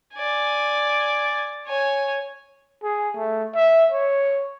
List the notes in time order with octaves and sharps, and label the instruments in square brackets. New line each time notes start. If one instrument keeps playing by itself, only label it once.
[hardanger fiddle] D5 G#5
C#5 G#5
[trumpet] G#4
A3
E5
C#5